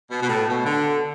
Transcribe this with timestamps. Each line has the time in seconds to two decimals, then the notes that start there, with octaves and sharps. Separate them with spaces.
0.11 B2
0.22 B2
0.29 A2
0.48 B2
0.65 D3